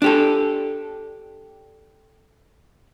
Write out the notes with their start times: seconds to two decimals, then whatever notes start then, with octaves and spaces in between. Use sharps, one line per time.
0.02 D4 G4 A4